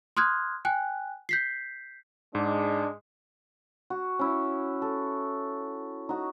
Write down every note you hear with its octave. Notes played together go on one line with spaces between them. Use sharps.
C6 D#6 F6 F#6 G#6
G5 G#5 F#6
G6 B6 C7
G#2 G#3 D4
F#4
C#4 E4
A4
D#4 F#4